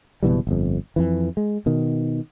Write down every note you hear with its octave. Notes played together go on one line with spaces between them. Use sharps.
F#1 B2 E3 G3
G1 F2
F2 E3
G#3
B2 D#3